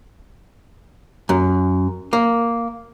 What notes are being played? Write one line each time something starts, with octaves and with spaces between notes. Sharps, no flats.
F#2
A#3